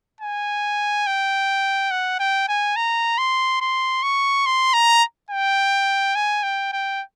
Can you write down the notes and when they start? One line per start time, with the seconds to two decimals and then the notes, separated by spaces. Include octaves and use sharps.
0.21 G#5
1.07 G5
1.91 F#5
2.19 G5
2.48 G#5
2.76 A#5
3.18 C6
3.61 C6
4.03 C#6
4.46 C6
4.73 A#5
5.31 G5
6.15 G#5
6.43 G5
6.73 G5